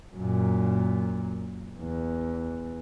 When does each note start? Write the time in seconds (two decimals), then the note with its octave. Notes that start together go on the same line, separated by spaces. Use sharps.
0.15 F#2 A#2
1.78 E2